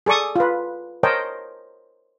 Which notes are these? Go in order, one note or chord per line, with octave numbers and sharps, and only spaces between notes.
G#4 A4 D5 C#6 D#6
F4 B4
A#4 C5 C#5 D#5 G5 A5